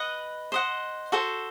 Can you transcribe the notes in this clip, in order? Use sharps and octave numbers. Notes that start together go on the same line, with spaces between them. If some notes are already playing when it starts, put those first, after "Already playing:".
Already playing: B4 D#5 F#5
C5 D#5 F#5
F#4 A4 C5